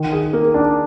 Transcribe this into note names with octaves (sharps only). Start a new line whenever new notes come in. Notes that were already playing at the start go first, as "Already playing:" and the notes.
Already playing: D#3
G#4
A#3
D4